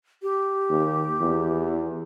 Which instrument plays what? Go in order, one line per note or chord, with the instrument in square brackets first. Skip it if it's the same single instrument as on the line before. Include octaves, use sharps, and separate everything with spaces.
[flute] G4
[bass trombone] D#2
E2